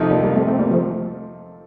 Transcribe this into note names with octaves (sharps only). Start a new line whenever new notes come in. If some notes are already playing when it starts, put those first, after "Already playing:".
Already playing: F2 C3 F3 A3 D#4
G3 A#3
G3 A#3
A3 C4
A3 C4
G3 A#3
F3 A3